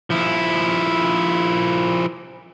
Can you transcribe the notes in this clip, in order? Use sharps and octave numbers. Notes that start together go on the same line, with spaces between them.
F3 E4